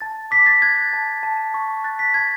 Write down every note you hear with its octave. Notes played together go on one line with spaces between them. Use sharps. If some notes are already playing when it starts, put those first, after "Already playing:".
A5 A6
D6 B6
A6
F#6 G#6
A5
A5
C#6
F#6 A6
B6
A5 G#6